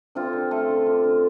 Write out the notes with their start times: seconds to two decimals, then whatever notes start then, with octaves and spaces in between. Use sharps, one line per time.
0.15 D3 C4 F4
0.33 D3
0.51 A3 F4 A4
0.68 D3
0.86 D3
1.04 D3